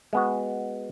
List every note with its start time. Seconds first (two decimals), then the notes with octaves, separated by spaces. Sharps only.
0.13 G#3 B3 F#4